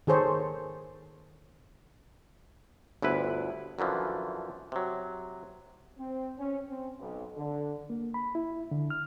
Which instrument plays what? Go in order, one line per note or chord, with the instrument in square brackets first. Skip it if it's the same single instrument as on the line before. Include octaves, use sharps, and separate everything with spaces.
[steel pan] D#3 G#4 A4 C5 C#5
[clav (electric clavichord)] G1 D2 E4 B4
F#2 D3 E3 F3
C3 F#3
[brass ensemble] C4
C#4
C4
B1
D3
[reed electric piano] A#3
B5
E4
D3
F6